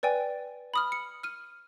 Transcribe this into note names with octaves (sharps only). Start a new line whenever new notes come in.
B4 D5 G5 G#5
B5 D#6 F6
C#7
F6 D#7